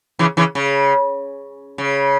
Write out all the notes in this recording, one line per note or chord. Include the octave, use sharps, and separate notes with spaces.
C#3 E3
C#3 E3
C#3
C#3